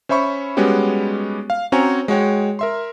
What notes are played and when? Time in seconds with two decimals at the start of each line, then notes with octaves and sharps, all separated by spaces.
0.09 C#4 C5 E5 B5 C#6
0.57 G3 G#3 B3 C#4 F#4 G4
1.50 F5
1.72 C4 C#4 F#4 C#5 G#5 A#5
2.08 G#3 F#4 C#5 G5
2.59 A#4 E5 C6